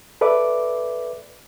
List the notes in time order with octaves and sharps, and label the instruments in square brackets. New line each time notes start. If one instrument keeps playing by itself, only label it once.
[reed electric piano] A4 B4 D5 E5 D6